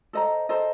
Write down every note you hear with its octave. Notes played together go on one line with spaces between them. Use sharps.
A4 C5 D#5 A#5
A4 C5 D#5 A#5